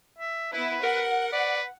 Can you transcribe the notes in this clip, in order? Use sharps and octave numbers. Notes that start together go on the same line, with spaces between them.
E5
B3 E4 B4
A#4 F#5
B4 D5